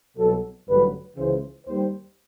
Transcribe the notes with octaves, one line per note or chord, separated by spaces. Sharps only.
C2 B2 F#3 A4
A1 G2 D3 F#3 B4
C#2 C#3 E3 G#3 C5
D#2 D#3 G3 C5